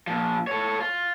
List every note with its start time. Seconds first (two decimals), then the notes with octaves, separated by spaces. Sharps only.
0.07 A#2 F3
0.47 A4 C#5
0.81 F4